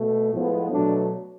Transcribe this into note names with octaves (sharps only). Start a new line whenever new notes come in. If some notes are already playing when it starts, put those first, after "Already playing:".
Already playing: B2 A3
A2 F3 G#3 B3
B2 F#3 A3 D4